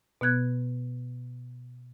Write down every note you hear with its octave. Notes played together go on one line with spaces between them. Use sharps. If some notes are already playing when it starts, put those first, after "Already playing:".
B2 B3 F#6 G#6